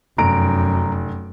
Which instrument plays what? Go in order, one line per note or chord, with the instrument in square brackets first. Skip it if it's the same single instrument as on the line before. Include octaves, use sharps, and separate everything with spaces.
[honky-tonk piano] F1 D7 [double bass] F#2 [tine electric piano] A#5